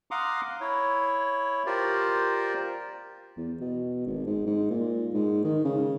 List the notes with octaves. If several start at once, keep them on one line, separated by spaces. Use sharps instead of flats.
F5 F#5 A#5 C6 D6 D#6
E4 C#5
F4 G4 A#4 C5 D5
E2
B2
G#1
G#2
G#2
A#2
G#2
D#3
C#3